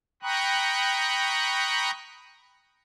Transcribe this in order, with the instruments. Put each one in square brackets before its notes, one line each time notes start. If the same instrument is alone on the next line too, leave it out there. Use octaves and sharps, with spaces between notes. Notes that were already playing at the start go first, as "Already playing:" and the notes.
[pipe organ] G5 A#5 B5 C#6 D#6 F#6